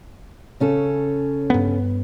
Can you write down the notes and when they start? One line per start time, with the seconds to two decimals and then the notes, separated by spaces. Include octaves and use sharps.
0.60 C#3 C#4 A4
1.50 G2 B3